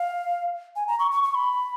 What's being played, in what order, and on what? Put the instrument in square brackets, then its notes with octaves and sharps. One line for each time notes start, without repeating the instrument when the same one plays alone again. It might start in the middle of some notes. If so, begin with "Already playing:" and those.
Already playing: [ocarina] F5
G#5
A#5
C#6
C#6
C#6
B5